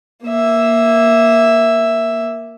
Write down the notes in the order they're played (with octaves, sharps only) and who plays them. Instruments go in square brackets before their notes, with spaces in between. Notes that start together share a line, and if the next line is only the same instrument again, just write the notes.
[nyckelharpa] A#3 E5